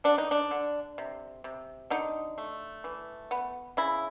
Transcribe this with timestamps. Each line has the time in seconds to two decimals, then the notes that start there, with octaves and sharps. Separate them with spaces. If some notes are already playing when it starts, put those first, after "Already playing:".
0.04 D3 D4
0.18 D#4
0.31 D4
0.51 D3
0.98 C3
1.44 C3
1.90 D3 D#4
2.38 A3
2.84 E3
3.31 B3
3.77 C#3 E4